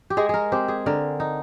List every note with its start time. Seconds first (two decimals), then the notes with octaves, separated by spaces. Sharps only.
0.10 G4
0.17 G#3 G#4
0.29 G#4 A#4
0.52 C4 G4
0.68 G#4
0.86 D3 A#4
1.20 D#4